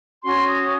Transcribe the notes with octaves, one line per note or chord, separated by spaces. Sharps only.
C#4 F#4 C#5 C6
D#6